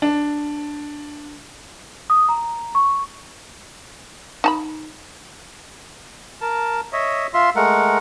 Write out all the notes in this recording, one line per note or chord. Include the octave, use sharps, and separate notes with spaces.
D4
D#6
A#5
C#6
D#4 A5 B5
A#4 A5
C#5 D#5 E5
F4 E5 C6
G#3 A3 A#4 F#5